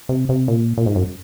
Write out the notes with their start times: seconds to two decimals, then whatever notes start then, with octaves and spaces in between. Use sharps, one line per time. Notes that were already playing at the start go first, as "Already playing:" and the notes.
0.09 C3
0.29 C3
0.48 A#2
0.78 A#2
0.86 G#2
0.95 F#2